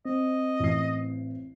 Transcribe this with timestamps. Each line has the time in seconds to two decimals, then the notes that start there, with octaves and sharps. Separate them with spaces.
0.05 C4 D#5
0.60 A1 E4 C7